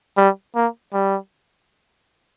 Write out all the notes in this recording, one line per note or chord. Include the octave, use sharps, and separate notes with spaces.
G3
A#3
G3